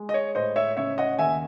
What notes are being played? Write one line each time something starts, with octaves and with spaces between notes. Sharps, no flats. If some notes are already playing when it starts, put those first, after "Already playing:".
Already playing: G#3
D#5
C#5
A2 C5 D#5
C#5 E5
C#3 C#5 E5
D#5 F#5
D#2 E5 G#5